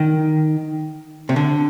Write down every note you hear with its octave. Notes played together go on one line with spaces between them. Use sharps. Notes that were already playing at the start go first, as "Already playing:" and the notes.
Already playing: D#3
C3
D3